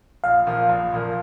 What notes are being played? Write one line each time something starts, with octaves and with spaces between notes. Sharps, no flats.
A#1 F5
A#2 F3 A#3
A#1
A#2 F3 A#3